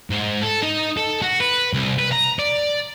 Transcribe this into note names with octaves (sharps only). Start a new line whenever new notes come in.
G#2
A4
D#4
A4
F#4
B4
C2
B4
A#5
D5